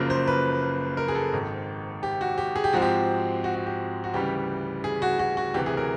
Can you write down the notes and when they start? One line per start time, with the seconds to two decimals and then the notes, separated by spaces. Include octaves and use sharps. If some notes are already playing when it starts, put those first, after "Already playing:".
Already playing: F#1 F#2 C#3 F3 A#3
0.10 C5
0.28 B4
0.97 A#4
1.08 G#4
1.15 A4
1.33 G#1 G#2 D#3
2.03 G4
2.21 F#4
2.38 G4
2.56 G#4
2.64 G4
2.73 G#2 F3 G#3 C4 F#4
2.82 G4
3.44 F#4
3.55 F#4
3.66 G4
4.04 F#4
4.13 D2 C#3 E3 G3 G4
4.84 G#4
5.02 F#4
5.19 F#4
5.37 F#4
5.54 D2 C3 E3 G4
5.66 G#4
5.77 A#4